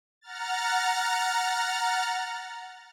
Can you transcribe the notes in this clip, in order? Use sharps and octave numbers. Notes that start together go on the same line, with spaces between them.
F#5 A#5 F6 A6